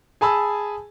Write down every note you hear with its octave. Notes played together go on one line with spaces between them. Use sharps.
G#4 G#5 A5 B5 E6